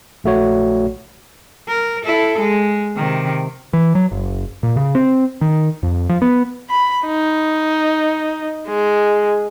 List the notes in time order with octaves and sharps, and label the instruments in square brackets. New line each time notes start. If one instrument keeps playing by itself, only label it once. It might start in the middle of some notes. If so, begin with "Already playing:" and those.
[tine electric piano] A#1 A3 F#4 C#5
[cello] A#4
E4 A4
G#3
C3 D#3
[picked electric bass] E3
F#3
F#1
A#2
C#3
C4
D#3
F2
F3
B3
[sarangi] B5
D#4
G#3